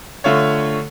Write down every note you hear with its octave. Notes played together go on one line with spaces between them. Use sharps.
D3 A3 F4 C#5